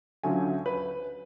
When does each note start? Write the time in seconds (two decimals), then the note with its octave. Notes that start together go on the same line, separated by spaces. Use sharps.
0.23 D2 D3 F#3 C#4 F4 G#5
0.66 B4